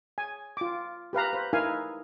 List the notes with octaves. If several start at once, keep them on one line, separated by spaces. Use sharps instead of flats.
G#5
F4 D6
G4 B4 F5 A#5
B4 C5
D#4 E4 A#4 F5 G#5